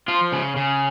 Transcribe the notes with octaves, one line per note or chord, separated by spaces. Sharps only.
F3 F4
C#3
C#3